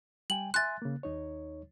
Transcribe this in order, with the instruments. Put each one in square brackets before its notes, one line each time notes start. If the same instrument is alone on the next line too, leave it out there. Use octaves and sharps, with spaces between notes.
[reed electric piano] G3 G5 G#5 [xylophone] F#7
[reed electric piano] E5 G#5 C6 [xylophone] F#6 A6
[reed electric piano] C#3 A#3
D#2 D#4 C#5